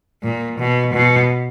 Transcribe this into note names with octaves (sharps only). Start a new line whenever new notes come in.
A#2
B2
B2